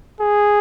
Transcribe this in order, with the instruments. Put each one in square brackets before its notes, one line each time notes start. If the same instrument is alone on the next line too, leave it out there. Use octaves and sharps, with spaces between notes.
[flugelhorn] G#4